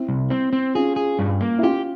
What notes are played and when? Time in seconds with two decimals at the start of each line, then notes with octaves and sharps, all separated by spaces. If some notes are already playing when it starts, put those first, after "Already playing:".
Already playing: C4 E4
0.09 C2
0.30 C4
0.53 C4
0.75 C#4 F4 G#4
0.96 G#4
1.19 G2
1.41 A#3
1.59 E4
1.62 C#4 F4 G4